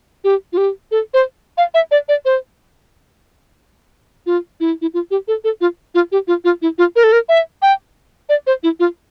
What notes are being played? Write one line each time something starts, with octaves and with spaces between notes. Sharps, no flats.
G4
F4
G4
A4
C5
F5
E5
D5
D5
C5
F4
E4
E4
F4
G4
A4
A4
F4
F4
G4
F4
F4
E4
F4
A#4
A4
A#4
E5
G5
D5
C5
E4
F4